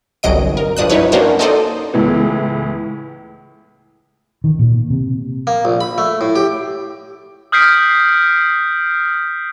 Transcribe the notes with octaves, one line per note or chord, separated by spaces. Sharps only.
G1 C2 F#3 D#5 D7
A#4
G2 F3 D4 D#6 F#6
F#3 D#4 E4 B4 C#5
A#3 C#4 D4 F#4 A#4 C5
D#4 A4 C5 D5 D#5
C#2 A2 E3 B3
D#3
A#2
C3
A#3
A#1
B5
A3
A2
G4
D#6 F6 G6 B6 C7 D7